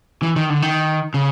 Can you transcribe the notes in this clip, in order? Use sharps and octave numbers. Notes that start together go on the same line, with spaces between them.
E3
D#3
D3
D#3
C#3